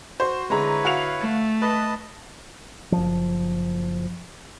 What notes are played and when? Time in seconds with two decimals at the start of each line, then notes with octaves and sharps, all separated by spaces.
0.20 F#4 C5
0.50 D3 G#3 E4 B4 C#5 A#5
0.85 F#4 F5 F7
1.19 A3
1.62 B4 D#5 A5
2.92 F#1 F3